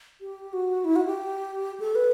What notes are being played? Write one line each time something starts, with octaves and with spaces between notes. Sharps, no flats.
G4
F#4
E4
F#4
G4
A4
B4